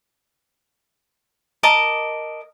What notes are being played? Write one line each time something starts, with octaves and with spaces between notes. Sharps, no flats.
A#4 D#5 A5 D6